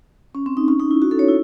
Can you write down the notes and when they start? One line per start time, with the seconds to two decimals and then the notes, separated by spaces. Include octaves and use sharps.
0.35 C#4
0.46 C4
0.57 D#4
0.68 C#4
0.80 D#4
0.91 E4
1.02 F#4
1.11 A4
1.19 C#5
1.28 E4